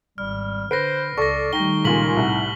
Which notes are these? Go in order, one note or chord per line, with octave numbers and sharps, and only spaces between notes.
G#1 G3 F6
D3 B4 C5 A#6 C7 D7
C#2 A4 D5 C#6 A#6
D#3 G3 A3 D#4 G5 A#6 G7
C#2 A#2 G#5 B6 F#7
C2 A2 E4 F#5